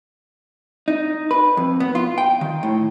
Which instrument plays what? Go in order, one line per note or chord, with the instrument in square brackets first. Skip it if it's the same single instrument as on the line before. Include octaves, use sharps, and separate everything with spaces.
[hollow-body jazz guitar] D#4
B4
F2
B3
F4
G5
D#3
A2